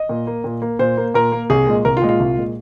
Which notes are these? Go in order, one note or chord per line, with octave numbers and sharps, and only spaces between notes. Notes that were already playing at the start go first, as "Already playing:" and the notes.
Already playing: D#5
A#2
A#3
A#2
A#3
A#2 C5
A#3
A#2 A#4
A#3
C2 G#4
A#2 G#3
C2 A#4
F4
A#2 G#3
F4
C2
A#2 G#3